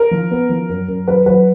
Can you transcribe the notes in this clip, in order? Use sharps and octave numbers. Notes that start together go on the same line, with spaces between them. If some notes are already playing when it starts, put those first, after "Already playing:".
Already playing: A#4
F3
B3
F3
F#2
F#2
F#3 B4
F#3 B4